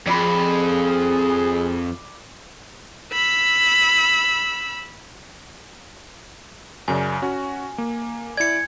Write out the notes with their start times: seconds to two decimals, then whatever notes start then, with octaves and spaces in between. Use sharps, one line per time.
0.07 F2 G#4 D5 B5 C6
3.13 B5 E6
6.88 F#2 C#3 D5 G#5
7.22 C#4 F#4
7.78 A#3
8.37 E4 D5 G#6 C#7